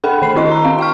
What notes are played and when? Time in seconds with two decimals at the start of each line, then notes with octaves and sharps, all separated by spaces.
0.04 D4 A4 F#5 G5 B5
0.22 D#3 C7
0.36 C4 E4 D#5 C6
0.49 A#5 C6
0.64 C4 F5
0.78 F5 G5 C#6 F6